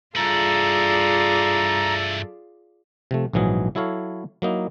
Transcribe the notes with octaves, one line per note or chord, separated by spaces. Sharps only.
G2 E4 F4 G#4 A4 D5 A#5
C3 F3 A3
A#1 G#2 E3 F#3 G#4
F#3 E4 A4 C#5 F5
F#3 A#3 D#4 E4